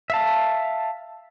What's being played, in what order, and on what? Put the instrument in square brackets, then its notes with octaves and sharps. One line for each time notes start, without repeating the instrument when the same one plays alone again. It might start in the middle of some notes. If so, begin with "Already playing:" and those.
[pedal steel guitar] E5 F5 A5